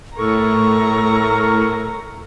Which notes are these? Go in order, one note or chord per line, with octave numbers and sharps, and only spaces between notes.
A2 A4 A#4 A#5 C#6